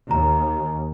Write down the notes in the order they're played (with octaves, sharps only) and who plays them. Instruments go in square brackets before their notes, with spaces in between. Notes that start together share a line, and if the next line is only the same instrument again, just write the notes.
[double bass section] D#2 [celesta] A#5